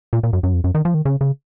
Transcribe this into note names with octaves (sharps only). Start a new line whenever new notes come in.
A#2
A#2
F#2
F#2
F2
F#2
D#3
F3
D#3
C#3
C#3